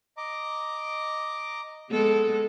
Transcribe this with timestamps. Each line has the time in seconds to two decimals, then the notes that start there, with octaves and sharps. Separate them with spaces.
0.17 D#5 A#5 D6
1.91 G#3 B3 A4